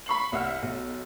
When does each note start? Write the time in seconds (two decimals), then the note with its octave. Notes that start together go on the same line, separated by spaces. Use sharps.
0.06 B5 C#6 C7 F#7
0.32 C2 E5 F#5 F6
0.62 B1